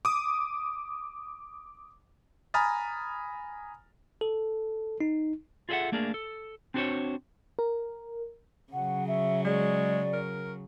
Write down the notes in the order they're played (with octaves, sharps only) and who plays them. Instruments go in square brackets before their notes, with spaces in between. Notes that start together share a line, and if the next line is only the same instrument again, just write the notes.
[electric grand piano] D6 D#6
G#5 A#5 B5 D#6 F6 A6
[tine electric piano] A4
D#4
[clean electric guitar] F4 G#4 A4 D#5 E5 F#5
A3 A#3 D4 G#4 A#4
A4
C4 D4 F#4 A4 C5 C#5
[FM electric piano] A#4
[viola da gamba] C#3 F#3 [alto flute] F#5
[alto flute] E5
[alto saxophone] G#3 [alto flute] D5
[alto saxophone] A#4